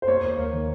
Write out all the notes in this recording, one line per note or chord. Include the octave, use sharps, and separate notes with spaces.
C5
A#3 C#5
D#2
A#3
D#3